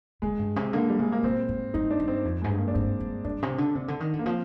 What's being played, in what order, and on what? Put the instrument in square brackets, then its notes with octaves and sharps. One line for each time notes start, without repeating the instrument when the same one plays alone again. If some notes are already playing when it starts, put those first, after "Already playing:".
[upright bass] D3 [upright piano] G#3
[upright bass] G2
C3
[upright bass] D3 [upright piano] A#3
[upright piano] G3
[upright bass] C3 [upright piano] G#3
[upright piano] A#3
[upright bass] A#2 [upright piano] C4
[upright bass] G#2
[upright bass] G2 [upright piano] D#4
[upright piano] D4
[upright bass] G2
[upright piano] C4
[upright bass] F2
[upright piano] G#3
[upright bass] G#2
G2
[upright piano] A#3
D4
[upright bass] G2 [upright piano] C4
[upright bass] G2
[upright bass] G2 [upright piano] D4
[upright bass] C3
D3
C3
D3
D#3
D3
[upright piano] A#3
[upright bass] F3 [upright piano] C4